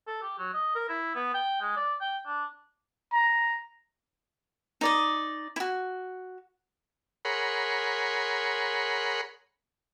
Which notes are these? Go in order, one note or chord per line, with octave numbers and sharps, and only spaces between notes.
A4
G4
F#3
D#5
A#4
E4
B3
G5
G#3
D5
G5
D4
A#5
D#4 D5 D#5
E4 F#4
G#4 A#4 C#5 F#5 B5 C6